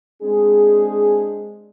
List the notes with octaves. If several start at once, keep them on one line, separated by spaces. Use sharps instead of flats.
G#3 C4 D4 G#4